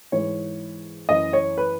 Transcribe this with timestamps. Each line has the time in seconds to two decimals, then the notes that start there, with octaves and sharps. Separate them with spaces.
0.12 G#2 E3 C#5
1.09 F#2 E3 D#5
1.33 C#5
1.58 B4